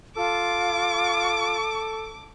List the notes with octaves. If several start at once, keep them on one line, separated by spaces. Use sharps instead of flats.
F4 A4 D6